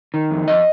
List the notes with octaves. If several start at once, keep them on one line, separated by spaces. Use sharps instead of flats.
D#3
F2
F2 D#5